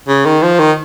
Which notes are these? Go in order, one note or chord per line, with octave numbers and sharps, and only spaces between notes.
C#3
D#3
F3
D#3